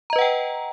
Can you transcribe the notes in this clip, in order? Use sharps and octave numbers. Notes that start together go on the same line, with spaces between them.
B4 D#5 F#5 G5 A#5